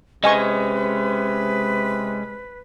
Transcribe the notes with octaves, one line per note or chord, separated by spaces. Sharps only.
C3 G#3 C#4 B4 D#5 G#5 C#6